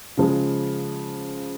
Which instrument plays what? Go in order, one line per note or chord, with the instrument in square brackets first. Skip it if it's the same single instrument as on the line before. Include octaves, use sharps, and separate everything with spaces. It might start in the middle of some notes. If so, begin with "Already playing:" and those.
[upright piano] C#3 F3 G#3